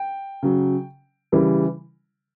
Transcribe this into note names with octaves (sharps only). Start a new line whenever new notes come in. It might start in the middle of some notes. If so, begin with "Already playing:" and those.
Already playing: G5
C#3 F#3
C#3 E3 G3